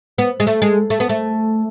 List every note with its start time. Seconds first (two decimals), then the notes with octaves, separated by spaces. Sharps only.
0.18 B3
0.40 G#3
0.47 A3
0.62 G#3
0.90 A3
1.00 B3
1.09 A3